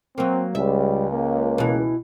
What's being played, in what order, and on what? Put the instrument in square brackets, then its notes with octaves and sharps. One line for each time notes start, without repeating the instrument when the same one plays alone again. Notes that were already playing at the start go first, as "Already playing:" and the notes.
[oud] F#3 A#3 [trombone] C4
[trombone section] C#2 [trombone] G3 [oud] E5
[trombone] A#3
[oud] B2 E3